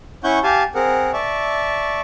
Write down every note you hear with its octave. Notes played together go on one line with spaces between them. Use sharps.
C#4 E4 F#5 C#6 G6
G4 F5 G#5 A5
C4 G#4 A#4 F#5
D5 E5 A5 C#6